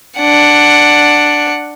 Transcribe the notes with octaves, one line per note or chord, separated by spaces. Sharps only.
D4 F#5